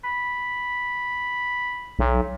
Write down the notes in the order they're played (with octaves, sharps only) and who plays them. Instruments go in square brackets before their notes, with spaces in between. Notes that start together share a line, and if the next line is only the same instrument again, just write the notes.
[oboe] B5
[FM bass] B1